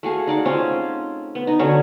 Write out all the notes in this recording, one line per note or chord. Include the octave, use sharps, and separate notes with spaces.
A3 F#4 G#4 F5
D#4 D5 F#5
C4 C#4 F4
B3
D#4
D3 F#3 C#4 C#6